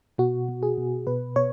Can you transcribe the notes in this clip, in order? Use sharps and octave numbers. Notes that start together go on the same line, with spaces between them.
B2 F#4
B2
G#4
B2
B2 B4
B2 C#5